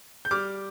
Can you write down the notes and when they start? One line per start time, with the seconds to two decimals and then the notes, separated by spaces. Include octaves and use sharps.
0.25 G6
0.31 G3 D6 F6